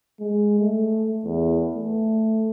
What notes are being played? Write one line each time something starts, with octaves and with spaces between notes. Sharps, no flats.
G#3
A3
E2
A3